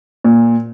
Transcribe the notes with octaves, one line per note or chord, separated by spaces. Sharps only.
A#2